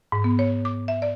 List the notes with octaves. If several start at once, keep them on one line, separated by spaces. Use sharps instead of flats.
G#2
B3
C#5
D6
E5
D5